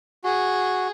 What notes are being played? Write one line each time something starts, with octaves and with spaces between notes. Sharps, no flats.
F#4 G#4